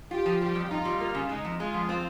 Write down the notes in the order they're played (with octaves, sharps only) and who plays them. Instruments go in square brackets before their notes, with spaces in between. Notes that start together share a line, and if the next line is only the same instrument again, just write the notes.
[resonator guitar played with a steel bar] F4 [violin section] G4
[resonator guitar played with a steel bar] F3
[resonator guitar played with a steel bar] G3 [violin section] G4
[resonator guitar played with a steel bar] F2
[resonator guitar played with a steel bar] D#4 [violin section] F4
[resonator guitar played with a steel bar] G3
A#3
C#3
[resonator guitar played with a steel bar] G#3 [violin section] D#4
[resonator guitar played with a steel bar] F2
[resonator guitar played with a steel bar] G#3 [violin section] F4
[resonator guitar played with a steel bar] F2
C4